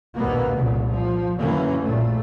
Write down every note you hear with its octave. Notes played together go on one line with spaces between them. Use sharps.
A#1 D#2 B2 A#3 B3
F1 C2 A#2 C#3
F3
F#2 D3 E3 F#3 A#3 C#4
A#1 A#2 A3